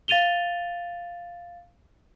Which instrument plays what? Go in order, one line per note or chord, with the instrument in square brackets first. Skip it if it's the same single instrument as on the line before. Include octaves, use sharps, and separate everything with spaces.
[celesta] F5 A6 D#7 F7 G7